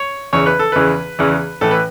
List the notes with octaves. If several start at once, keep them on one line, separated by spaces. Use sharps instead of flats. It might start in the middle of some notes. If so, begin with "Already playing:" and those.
Already playing: C#5
E2 C#3 E3 C#5
B4
A4
E2 C#3 E3 B4
E2 C#3 E3
A2 E3 A4
B4